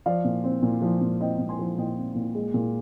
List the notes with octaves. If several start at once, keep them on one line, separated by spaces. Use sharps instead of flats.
F3 D5 F5
A#2
C4
A#2
F3
A#2
C4 D#5 G5
A#2
G#5 C6
F3
A#2 D#5 G5
C4
A#2
G#3
A#2